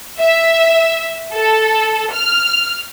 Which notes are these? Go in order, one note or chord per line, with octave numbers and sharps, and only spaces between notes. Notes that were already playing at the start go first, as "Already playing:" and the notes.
E5
A4
F6